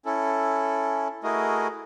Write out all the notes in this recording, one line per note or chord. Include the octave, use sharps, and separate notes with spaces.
C#4 E4 A4
A3 E4 F#4 G#4 A#4 D#5